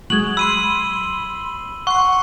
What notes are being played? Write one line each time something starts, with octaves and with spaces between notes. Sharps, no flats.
F#3 G#3 F#7
B5 C6 E6 D#7
F#5 C6 C#6